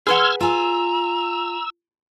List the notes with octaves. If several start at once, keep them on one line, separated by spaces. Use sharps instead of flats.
G#4 B4 F#5 C6 E6 F6 G#6
F4 G#5 A#5 E6